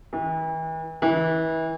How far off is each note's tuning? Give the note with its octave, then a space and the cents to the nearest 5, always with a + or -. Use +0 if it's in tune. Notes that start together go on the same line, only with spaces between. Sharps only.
E3 -40
E3 -30